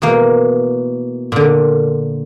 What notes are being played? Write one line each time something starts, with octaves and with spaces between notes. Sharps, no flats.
B2 E3 A#3
A#2 D3